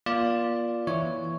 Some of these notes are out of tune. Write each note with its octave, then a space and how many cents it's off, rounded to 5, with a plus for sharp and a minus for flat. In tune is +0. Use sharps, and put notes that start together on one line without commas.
A#3 +40 F4 +0 D5 +0
E3 +0 E4 +0 C#5 +0